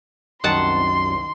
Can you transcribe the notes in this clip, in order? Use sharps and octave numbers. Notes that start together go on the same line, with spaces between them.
C2 F#2 D#3 F#5 A5 C6